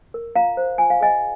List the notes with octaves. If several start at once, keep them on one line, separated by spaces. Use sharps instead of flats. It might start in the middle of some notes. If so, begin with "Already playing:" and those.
A#4
F4 F5 A#5
C5
F4 G#5
F5
G#4 D#5 G#5